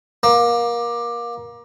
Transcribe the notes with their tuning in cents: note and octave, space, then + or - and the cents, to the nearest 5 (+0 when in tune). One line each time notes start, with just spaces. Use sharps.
A#3 +25